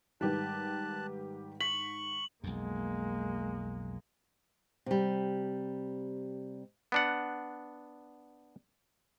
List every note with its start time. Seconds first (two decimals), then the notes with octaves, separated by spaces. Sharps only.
0.21 G#2 D#3 G3 G4 B4 A5 F#6
1.61 C#6 B6 F#7
2.44 B1 F2 G#3 A#3
4.86 C3 G3
6.92 B3 D4 F#5